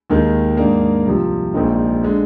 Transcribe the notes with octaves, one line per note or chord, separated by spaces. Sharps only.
D#2 D#3 G#3
G#2 D#3 A#3 D4
C2 C3 F3
A#1 A#2 G#3 C4 D#4
D3 G#3